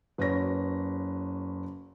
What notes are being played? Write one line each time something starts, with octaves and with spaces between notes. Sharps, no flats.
F#1 B4 C#5 A#6